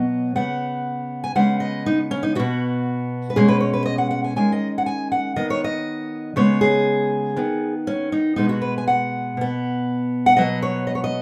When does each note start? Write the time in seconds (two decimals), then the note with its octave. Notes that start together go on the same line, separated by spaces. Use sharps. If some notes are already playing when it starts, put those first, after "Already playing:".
Already playing: B2 F#3 B3 D#5
0.35 C#3 B3 F#5
1.24 G#5
1.35 C#3 G#3 B3 F#5
1.60 D#5
1.86 D#4
2.11 C#4
2.23 D#4
2.35 B2 B3 F#4
3.30 B4
3.36 B2 G#3 C#4 G#4
3.48 B4
3.60 C#5
3.73 B4
3.85 D#5
3.98 F#5
4.11 F#5
4.24 G#5
4.36 D#3 G#3 C#4 G#5
4.52 D#5
4.78 F#5
4.86 G#5
5.12 F#5
5.36 D#3 B3 D#5
5.50 C#5
5.64 D#5
6.36 C#3 G#3 B3 C#5
6.61 G#4
7.36 D#3 B3
7.87 C#4
8.12 D#4
8.36 B2 G#3 B3 D#4
8.49 F#4
8.62 B4
8.78 G#5
8.88 F#5
9.37 B2 B3
10.26 F#5
10.37 B2 F#3 B3 D#5
10.62 C#5
10.87 D#5
10.95 C#5
11.04 D#5